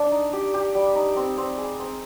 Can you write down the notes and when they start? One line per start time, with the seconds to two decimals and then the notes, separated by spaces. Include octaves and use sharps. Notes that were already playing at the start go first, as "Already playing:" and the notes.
Already playing: D4 D5
0.12 D#4
0.33 G4
0.54 G4
0.75 G3
0.95 D#4
1.16 C4
1.38 C4
1.58 G#4
1.80 C4